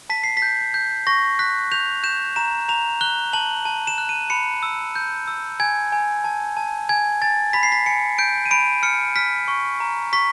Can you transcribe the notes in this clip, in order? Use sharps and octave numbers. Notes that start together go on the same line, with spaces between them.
A5 B6
C7
B6
G6
G6
C#6 A#6
F#6 B6
G6 F7
G6 E7
A#5 E7
A#5 F7
F#6 G7
A5 F#7
A5
E7
F#6
D#7
B5 C#7
E6
G6
E6
G#5 G#6
G#5
A5
A5
G#5 G#6
G#5 A6
B5 B6
C7
B6
G#5 C#7
G6 D7
D#7
B5 D7
F6 C#7
F6 B6
C#6
A#5
C#6 B6